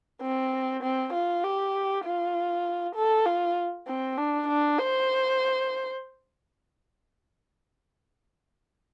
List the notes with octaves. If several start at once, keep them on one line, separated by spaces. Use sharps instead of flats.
C4
C4
F4
G4
F4
A4
F4
C4
D4
D4
C5